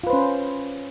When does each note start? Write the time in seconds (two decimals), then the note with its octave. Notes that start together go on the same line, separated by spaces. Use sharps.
0.04 F4
0.07 B4
0.10 C5
0.13 C#4